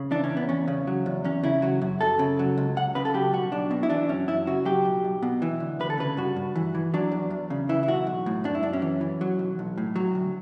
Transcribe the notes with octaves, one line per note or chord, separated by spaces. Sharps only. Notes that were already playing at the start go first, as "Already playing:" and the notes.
Already playing: C#3
E3 D4
C#4
E2
B3
E2 C#4
C#3
F#3
E2
E2 C#4
C#3 E4
F#3 F#4
F#2
F#2 A4
C#3
F#3
C#2
C#2 F#5
C#3 B4
A4
F#3 G4
B1 F#4
B1 D4
B2
E4
E3 D4
F#2 C#4
F#2 E4
C#3 F#4
F#3 G4
B1
B1
B2
E3
D2
D2 B4
A4
C#3 B4
G2 F#4
G2
E3
E3
F#3 D4
E2
E2
C#3
E3 E4
E4
B1 F#4
B1
A2
F#2 D4
E4
F#2 D4
C#4
E3
E3
F#3
B1
B1
A2
F#3
D2